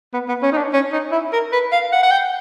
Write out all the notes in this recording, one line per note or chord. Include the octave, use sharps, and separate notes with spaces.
B3
B3
C#4
D#4
D4
C#4
D#4
E4
A#4
B4
F5
F#5
F#5
G5